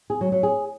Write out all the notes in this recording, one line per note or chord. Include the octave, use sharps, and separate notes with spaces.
G#4
F#3
F#3
G#4